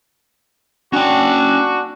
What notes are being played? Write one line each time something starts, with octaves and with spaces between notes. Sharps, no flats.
C#4 D4 F#4 G5